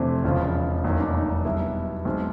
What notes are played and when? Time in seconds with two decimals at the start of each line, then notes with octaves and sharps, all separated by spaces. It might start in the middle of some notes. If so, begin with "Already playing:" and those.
Already playing: F2 C3 E3 A3 C4 D4
0.24 E1 E2 C#3 F3
0.84 F1 E2 B2 F#3 A#3 D#4
1.00 D4
1.15 D#4
1.30 D#4
1.45 B1 B2 G3 B3 E4
2.05 B1 B2 G#3 C4